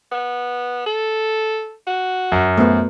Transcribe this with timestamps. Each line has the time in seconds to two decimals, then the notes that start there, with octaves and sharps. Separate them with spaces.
0.11 B3
0.86 A4
1.87 F#4
2.32 F#2
2.58 F3 A3 B3